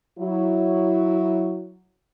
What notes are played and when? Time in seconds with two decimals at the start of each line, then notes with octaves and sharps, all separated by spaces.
0.18 F#3 E4